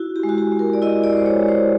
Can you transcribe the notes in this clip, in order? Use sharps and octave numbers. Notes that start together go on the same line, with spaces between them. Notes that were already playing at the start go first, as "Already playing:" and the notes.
Already playing: E4 F#4
G4
G#3
F#4
G4
G#3
A#4
D5
E4 D#5
D5
G#3
C5
C#5
G#3
C5